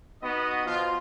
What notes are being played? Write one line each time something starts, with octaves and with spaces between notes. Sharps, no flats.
B3 D#4 F#4 D#5
B2 F3 F4